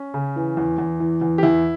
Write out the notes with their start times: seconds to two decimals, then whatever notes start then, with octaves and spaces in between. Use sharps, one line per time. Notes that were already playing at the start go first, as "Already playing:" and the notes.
Already playing: C#4
0.14 C#3
0.36 E3
0.57 E2
0.78 E2
1.00 E3
1.22 E2
1.38 G4
1.43 E2 E4